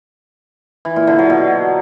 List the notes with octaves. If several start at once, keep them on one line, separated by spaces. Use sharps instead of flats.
E3
A#2
D3
F#3
B2